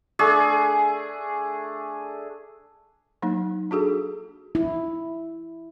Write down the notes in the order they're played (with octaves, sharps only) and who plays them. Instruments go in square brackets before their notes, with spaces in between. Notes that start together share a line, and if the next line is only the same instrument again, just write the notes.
[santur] A3 D4 G#4
[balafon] F#3 A#3 D#4
D4 F#4 G#4 A4
[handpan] E4